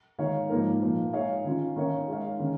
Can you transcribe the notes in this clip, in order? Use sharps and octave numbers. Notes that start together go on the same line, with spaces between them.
D#3 G#3 D#4 C#5 F5
G#2 F3 A#3 D#4 A#4
A#2 F3 A#3
G#3 D#4 G#4 C#5 F5
D#3 C#4 F4
D#3 C#4 A#4 C#5 F5
G#3 D#4 C#5 F5
D#3 C#4